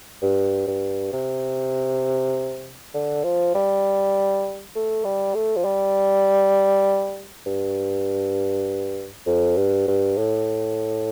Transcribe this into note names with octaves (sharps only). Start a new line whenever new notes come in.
G2
G2
C3
D3
F3
G3
A3
G3
A3
F3
G3
G2
F2
G2
G2
A2